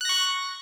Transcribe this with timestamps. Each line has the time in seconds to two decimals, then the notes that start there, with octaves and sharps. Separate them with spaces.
0.01 F#6
0.05 A#6
0.09 C#6